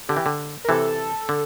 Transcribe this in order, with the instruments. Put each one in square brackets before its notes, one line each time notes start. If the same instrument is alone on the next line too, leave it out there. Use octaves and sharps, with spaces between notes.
[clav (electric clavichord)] D3 [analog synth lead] G4
[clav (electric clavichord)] E3
D3
[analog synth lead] A#4
[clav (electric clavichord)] C3 E3 [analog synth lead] A4
[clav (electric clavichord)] D3